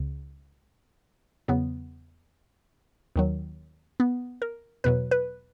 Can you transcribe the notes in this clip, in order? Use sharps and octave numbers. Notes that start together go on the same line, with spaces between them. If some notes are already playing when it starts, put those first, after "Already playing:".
Already playing: C#2 C#3
E2 C#3 F#3 B3
D#2 D#3 F#3
B3
A#4
E2 B2 F#3 B4
B4